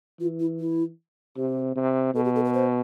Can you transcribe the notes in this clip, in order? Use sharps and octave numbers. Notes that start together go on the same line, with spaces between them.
E3 F4
E4
E4
C3 G4
C3
B2 A4
G4
A4
B4
C5